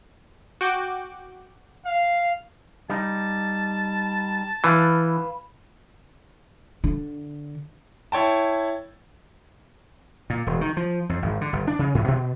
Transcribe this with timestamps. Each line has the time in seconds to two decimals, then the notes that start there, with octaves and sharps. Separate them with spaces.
0.61 F#4 G5 D6
1.86 F5
2.90 G3 D#4 A5
4.64 E3 B4 F5
6.84 D3
8.12 E4 C#5 G5 A5
10.30 A#2
10.47 E1
10.61 D#3
10.77 F3
11.09 F2
11.22 G#1
11.41 D3
11.53 G1
11.68 D4
11.79 C#3
11.95 G#2
12.08 B2